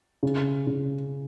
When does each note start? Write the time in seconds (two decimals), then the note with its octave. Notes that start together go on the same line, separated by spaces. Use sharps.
0.23 C#3
0.67 C#3